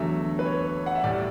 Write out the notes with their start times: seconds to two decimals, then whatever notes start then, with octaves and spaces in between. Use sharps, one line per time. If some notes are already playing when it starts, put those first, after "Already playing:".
Already playing: E2 D3 F#3 A3 E5
0.39 B4
0.45 C#5
0.86 F#5
0.95 E5
1.04 A2 G3 D5